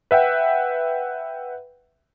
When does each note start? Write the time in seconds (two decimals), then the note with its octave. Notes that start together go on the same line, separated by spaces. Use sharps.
0.11 B4 E5 F#5 G5